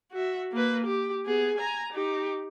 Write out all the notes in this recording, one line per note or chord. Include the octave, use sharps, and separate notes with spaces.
F#4 E5
A#3 B4
G4
B3 G#4
G#5 A#5
D#4 G4